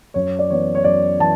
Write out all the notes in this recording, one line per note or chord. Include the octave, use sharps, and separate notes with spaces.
F#2 C#5
D5
E3 B3 C#5
C#5
F#2 D5
E3 A5